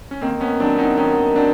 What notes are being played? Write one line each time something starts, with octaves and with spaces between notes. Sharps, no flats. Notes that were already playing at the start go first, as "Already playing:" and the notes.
C#4
D#3 A#3 C4
B3 C#4
F#3 B3 C4 D4
C#4 D#4
D#3 C#4 D#4
F#3 C4 D4